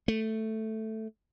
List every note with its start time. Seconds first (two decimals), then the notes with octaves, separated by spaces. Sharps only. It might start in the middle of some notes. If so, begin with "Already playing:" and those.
0.08 A3